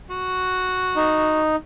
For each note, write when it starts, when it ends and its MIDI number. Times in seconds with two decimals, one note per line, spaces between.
0.11 1.41 66
0.96 1.56 63